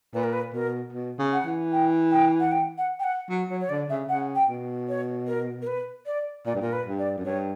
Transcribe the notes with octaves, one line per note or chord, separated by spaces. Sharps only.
A#2 B4
A#4
B4
B2 A#4
B2
C#3
F#5
E3
G5
G5
F#5
G5
F#5
G5
F#5
F#3
F#3 C#5
C#5
D3 D5
C#3 E5
C#3 F#5
G5
B2
C#5
A#4
A#4
B4
D5
A#2 D5
G2
A#2 A#4
B4
G2
D5
F#2
G2 C#5